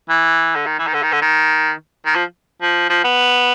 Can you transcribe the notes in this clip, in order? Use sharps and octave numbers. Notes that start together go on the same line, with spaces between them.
E3
D3
D#3
E3
D#3
D3
D#3
D3
D#3
D#3
F3
F3
F3
B3